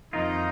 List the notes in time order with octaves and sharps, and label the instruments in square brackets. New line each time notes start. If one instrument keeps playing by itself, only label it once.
[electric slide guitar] F2 D#3 A#3 F4 [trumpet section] D#4